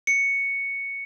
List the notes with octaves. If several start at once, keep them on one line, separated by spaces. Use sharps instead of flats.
C#7